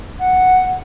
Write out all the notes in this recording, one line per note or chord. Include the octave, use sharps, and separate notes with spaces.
F#5